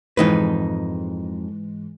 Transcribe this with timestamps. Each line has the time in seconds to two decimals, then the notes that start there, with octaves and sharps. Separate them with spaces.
0.17 F2 G#2 E3 G#3 D#4 B4